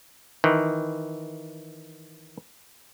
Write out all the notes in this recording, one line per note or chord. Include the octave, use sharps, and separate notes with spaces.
D#3 E3